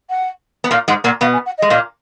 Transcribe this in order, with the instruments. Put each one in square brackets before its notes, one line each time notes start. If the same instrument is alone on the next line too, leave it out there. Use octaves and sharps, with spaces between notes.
[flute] F#5
[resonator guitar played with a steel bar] B3
[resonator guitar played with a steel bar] A#2 A#3 [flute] F5
[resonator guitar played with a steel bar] G#2 G#3 [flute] F#5
[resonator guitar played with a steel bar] A#2 A#3 [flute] F#5
[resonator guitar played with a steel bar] B2 B3 [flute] F5
[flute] G#5
F#5
[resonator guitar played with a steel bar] G#3 [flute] D#5
[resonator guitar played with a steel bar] A#2 A#3